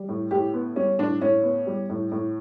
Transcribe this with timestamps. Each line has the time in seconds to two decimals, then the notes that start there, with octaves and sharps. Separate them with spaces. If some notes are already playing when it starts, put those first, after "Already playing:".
Already playing: G3
0.09 A2
0.31 A2 G4
0.54 B3
0.76 G3 C#4
0.98 A2 D4
1.21 A2 C#4
1.43 B3
1.67 G3
1.89 A2
2.12 A2